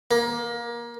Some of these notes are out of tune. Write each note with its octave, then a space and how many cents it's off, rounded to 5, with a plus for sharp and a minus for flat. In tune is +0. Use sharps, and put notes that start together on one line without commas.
A#3 +25